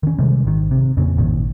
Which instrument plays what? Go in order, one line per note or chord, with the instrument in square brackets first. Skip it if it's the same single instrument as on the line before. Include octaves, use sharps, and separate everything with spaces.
[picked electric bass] D#3 C#4
C3 D#3 G3 G#3
G#1 D#3
C3
F2 A#2 C#3
G#1 A#2 D#3